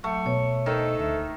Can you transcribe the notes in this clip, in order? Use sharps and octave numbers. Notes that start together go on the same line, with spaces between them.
F#3 A3 C#6
B2 C#5
D#3 A4 C5 D#5
D2 E5